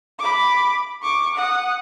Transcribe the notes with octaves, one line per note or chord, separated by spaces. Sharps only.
B5 D6
C#6 D6
F#5 D#6